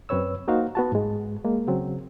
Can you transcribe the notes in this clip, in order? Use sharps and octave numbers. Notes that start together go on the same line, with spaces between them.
F#2 C4 B4 C#5 E6
A#3 D#4 F#4 C5 F5
B3 F#4 A5
G#2 G#3
G#3 A#3
C#3 F#3 C4